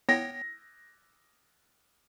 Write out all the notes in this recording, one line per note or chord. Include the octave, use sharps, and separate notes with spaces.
B3 C#5 G5 A#6